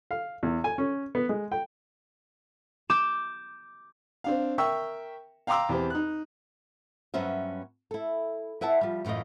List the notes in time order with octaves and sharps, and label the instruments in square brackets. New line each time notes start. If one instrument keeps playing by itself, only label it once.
[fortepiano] F5
E2
G#5
C#4
B3
G#3
G5
[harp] D6 G6 E7
[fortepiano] C4 D4 F5
A#4 E5 G5 C#6 E6
F5 G5 A#5 C6 D6 E6
E2 C4 G4
D#4 F#6
[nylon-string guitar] G2 F#3 B3 C#4 C5 E5
E4 A4
E4 B4 E5 F#5 A5
F3 G3
F#2 A2 E3 F4 D#5